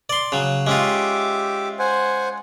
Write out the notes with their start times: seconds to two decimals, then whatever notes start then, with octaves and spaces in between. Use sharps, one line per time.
0.09 D5 C6
0.32 C#3 F#3
0.67 G#3 C#4 F4 G4 E5 D6
1.79 C5 F#5 G#5